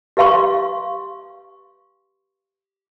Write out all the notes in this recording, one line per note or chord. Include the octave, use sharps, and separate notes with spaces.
G4 B4 F5 C6 C#6